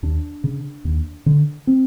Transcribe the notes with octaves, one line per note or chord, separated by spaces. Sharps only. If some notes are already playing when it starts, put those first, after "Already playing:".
D#2 D4
C#3
D#2
D3
C4